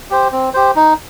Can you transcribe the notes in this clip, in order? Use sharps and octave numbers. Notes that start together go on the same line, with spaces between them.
G4 C5
C4
G4 C5
D#4